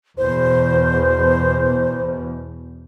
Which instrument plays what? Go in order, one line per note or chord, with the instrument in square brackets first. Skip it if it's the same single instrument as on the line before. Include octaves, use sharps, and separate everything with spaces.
[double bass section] E2 B2 [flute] C5